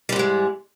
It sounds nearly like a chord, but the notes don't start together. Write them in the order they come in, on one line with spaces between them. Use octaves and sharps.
G3 G#2 E3 G#3